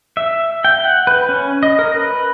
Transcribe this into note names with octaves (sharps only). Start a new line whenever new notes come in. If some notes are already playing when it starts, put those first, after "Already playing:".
E5
G5
F#5
B4
C#4
D#5
A#4
B4